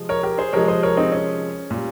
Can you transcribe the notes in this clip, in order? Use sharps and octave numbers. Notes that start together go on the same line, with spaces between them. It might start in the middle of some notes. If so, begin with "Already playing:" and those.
Already playing: C3 F3 G#3
A#4 C#5
G4 A#4
G#4 C5
C3 F3 G#3 A#4 C#5
C5 D#5
A#4 C#5
C4 D#4
C#4
A#2
G3